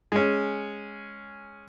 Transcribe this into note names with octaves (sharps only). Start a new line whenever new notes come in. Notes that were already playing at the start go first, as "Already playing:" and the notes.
G#3 C#4